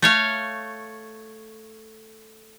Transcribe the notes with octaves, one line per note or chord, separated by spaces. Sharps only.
A3 C#5 F5